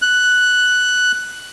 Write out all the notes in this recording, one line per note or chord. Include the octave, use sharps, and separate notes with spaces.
F#6